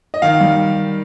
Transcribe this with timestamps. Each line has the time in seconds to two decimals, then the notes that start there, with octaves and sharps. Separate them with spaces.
0.14 D#5
0.22 D#3 F5
0.40 G3